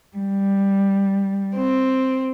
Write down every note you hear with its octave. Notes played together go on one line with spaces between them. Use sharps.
G3
C4